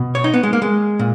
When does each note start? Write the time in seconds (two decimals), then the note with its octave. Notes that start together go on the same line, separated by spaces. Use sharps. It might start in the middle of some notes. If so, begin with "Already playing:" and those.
Already playing: B2
0.15 C#5
0.24 D#4
0.33 B3
0.43 G#3
0.53 A#3
0.62 G#3
0.99 A#2